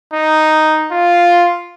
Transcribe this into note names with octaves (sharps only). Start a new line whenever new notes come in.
D#4
F4